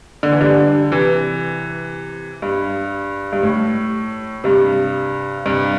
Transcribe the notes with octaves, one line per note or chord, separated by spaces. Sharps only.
D3
E3
D3 G3
C3 E3
G2
G2
A2
G2 C3
G2 C3